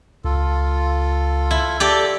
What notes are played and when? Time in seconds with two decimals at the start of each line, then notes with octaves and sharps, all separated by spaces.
0.24 C#2 F4 A4
1.51 E4
1.80 G4 A4 D5